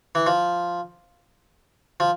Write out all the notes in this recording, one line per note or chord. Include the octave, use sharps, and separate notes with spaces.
E3
F3
F3